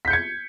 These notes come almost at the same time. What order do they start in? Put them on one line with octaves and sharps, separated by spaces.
B6 G6 C#7 G#6